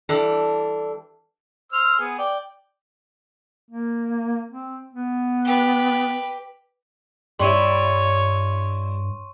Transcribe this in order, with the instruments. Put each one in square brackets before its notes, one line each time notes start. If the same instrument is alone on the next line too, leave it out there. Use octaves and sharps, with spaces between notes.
[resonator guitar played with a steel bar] E3 G3 D4 A4 A5
[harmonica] C5 E6 F6
B3 G#4
D5 G5
[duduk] A#3
C4
B3
[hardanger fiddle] G4 B4
[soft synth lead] G2 [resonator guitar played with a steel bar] G3 E4 [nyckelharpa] C#5 [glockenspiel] C6 C#6 D#7